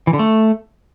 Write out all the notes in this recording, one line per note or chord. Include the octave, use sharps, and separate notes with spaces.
E3
D3
A3